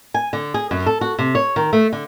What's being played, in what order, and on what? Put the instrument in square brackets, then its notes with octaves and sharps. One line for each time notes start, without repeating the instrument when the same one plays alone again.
[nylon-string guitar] G#5
D3
G#4
F#2
A4
F#4
C3
C#5
D#3
A3
D3